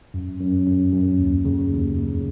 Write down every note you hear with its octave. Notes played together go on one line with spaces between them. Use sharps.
F#2
F#2
F#2
F#2
D#2
C#3
D#2
C#3